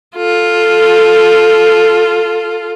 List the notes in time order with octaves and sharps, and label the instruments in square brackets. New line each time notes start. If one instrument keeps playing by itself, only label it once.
[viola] F4 A4